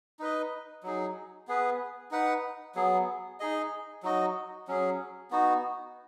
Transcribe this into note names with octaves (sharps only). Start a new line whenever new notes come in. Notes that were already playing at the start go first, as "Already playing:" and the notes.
D#4 B4 D#5
F#3 D#4 G#4
B3 G#4 B4
D#4 B4 F#5
F#3 B3 G#4
D#4 G#4 D#5
F#3 D#4 F#4 D#5
F#3 C#4 G#4
B3 D#4 F#4